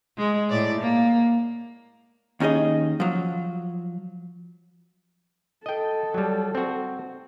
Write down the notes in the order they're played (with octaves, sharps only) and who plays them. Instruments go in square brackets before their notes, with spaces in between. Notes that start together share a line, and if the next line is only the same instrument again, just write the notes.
[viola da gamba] G#3
A2 D5
A#3
[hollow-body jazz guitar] D#2 C#4 D#4 G#4 D#5
F3 F#3
[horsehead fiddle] A4 [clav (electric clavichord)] D#5 G5
[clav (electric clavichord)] F#3 G3
C4 F#4